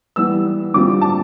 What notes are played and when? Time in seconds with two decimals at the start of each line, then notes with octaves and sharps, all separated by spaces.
0.16 E3 G3 B3 E6
0.74 D3 G3 C4 F4 D6
1.01 A5